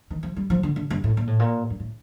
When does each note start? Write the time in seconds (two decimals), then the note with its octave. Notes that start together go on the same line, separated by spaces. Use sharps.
0.10 D#3
0.23 F3
0.36 G3
0.50 F3
0.63 D3
0.76 D3
0.90 G2
1.04 A2
1.17 A#2
1.27 A2
1.39 A#2
1.70 G2
1.80 A2